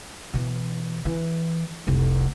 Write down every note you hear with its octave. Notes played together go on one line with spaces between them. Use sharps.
B2 E3
E3
F1 C2